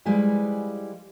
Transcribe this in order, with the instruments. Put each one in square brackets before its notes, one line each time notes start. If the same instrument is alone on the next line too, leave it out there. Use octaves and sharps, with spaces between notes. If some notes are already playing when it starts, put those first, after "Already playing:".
[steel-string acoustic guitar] F3 G3 G#3 E4 B4 G#5